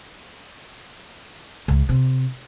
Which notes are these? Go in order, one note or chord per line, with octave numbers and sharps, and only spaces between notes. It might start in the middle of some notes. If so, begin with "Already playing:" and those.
C#2
C3